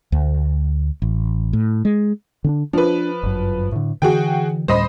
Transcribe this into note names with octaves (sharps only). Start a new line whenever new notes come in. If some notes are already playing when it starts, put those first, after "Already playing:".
D2
A1
A2
G#3
D3 C#4 D4
F3 D4 B4
G1 F#2
A2 D3
D3 E3 F#4 G#4 G5
D2 A2 G3 C5 D#5 B5